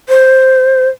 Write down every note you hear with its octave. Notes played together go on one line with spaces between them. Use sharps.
C5